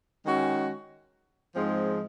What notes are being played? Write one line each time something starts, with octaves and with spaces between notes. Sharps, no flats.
D#3 G#3 C#4 F#4
G#2 F3 G#3 C4